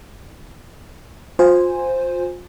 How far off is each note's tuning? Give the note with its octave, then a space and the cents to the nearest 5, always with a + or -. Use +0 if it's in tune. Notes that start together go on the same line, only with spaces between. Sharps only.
F4 +35 C5 +0 G#5 -15